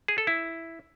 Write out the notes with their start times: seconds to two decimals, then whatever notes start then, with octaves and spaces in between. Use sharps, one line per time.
0.08 G#4
0.18 A4
0.27 E4